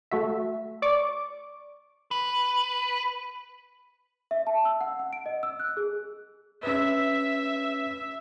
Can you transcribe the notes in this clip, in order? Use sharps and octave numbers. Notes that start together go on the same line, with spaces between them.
A3 F#4 E5
D5 C#6 D6
B4
E5
A5
E6
F#5
F#5
D7
D#5
E6
F#6
G#4
C#4 B4 E5